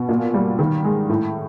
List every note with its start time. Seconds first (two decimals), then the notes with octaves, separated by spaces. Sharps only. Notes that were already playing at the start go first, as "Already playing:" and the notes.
Already playing: B2
0.09 A#2
0.34 G3
0.59 D#3
0.84 G#3
1.09 A2